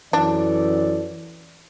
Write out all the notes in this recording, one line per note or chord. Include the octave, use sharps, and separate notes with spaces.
F#2 E3 D4 A4 D5